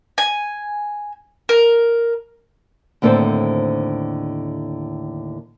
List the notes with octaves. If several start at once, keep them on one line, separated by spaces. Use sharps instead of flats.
G#5
A#4
D#2 A2 D3 C4 A4 C5